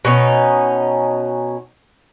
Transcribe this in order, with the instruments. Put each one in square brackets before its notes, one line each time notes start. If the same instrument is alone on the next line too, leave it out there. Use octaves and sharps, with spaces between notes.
[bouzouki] B2 C#4 D#4